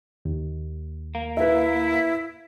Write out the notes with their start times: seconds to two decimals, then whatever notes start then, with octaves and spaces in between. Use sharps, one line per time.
0.25 D#2
1.15 A#3
1.37 E4 B4 E5